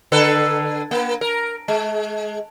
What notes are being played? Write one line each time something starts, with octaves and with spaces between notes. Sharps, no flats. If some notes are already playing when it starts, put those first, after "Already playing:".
D3 A4 B4
A#3
A#4
G#3